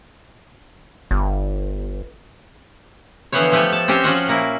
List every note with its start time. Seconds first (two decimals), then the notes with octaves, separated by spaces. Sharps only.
1.11 G1
3.33 D3 E3 F3 B3 C5 C#5
3.52 F3 A3 G4 C#5 G#5
3.72 A5
3.88 C4 C#4 G4 C5 G5 G#5
4.04 F3 C#4 F4 F#4
4.27 A#2 A#3 E4